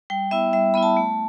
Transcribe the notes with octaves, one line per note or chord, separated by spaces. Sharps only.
G3 G5
B3 E4 E5
G3 E5
B3 E4 B5
A5
A3